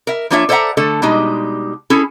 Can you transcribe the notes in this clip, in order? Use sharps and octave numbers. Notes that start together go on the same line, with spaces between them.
A#4 E5
F3 A#3 D4 F4 C#5 E5
A4 C5 D5 E5 F#5 A#5
D3 A3 A4
B2 G3 G#3 D#4
C#4 E4 G#4 A4